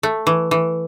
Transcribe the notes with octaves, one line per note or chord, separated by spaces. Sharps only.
A3
E3
E3